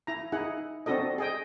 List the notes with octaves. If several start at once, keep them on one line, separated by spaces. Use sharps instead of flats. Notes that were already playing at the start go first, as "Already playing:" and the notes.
E4 A#5
D#4 E4 G#4 F#5
C4 D4 F#4 A4 D#5
G#4 D#5 G5